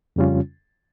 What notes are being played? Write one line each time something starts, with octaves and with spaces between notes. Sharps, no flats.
F2 C#3 G3 C#4 F4